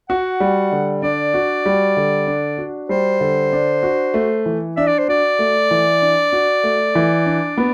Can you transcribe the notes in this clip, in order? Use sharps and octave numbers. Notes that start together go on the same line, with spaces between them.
F#4 F#5
G3
D3
D4 D5
F#4
G3
D3
D4
F#4
G3 C5
D3
D4
F#4
A3
E3
D4 E5
D5
C5
F#4 D5
A3
E3
D4
F#4
A3
E3
D4
B3